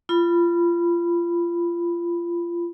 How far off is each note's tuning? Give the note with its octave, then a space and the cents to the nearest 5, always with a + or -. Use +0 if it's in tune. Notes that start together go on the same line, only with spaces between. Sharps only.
F4 -25 B5 +0